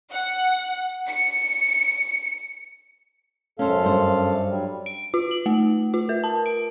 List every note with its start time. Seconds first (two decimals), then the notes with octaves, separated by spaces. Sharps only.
0.11 F#5
1.07 C#7
3.59 F#2 C#4 A4 C5 F5
3.84 G2 C5
4.48 F#3 G3
4.86 D7
5.14 F4
5.31 F#7
5.46 A3
5.94 F4
6.09 A#4
6.24 A5
6.46 D7